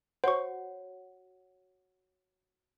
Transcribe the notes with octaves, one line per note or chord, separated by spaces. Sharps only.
F#4 C5 C#5 F#5 C#6